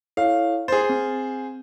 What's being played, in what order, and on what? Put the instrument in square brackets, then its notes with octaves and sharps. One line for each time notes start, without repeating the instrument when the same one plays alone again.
[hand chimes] E4 A4 C#5 [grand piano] F5
[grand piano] G#4 C5 [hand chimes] A6
[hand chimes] C4